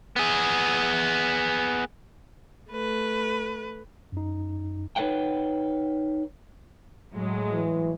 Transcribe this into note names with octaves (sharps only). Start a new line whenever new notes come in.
B3 G#4
A3 B4
F#2 D#4
D#4 B4 C#5 F#5 G5
A2 F#3 G#3
E3